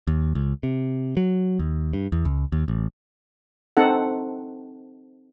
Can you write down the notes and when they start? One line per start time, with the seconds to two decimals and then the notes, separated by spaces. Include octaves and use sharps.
0.07 D#2
0.35 C#2
0.63 C3
1.17 F#3
1.59 D#2
1.93 G2
2.12 E2
2.25 C#2
2.52 D#2
2.68 A1
3.77 C4 D#4 A4 F#5